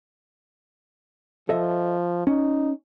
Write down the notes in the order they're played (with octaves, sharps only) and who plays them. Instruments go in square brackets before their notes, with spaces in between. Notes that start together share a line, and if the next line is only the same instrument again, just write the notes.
[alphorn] F3 [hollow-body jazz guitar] A4 D#5 E5
[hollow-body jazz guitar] C#4 [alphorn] D#4